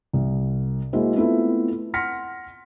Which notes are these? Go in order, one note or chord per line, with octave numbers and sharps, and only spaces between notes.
C2
G#3 A#3 E4 F#4 G#4 C5
A3 B3 C4 E4 F4 A4
F#5 C6 F6 A#6 B6 C#7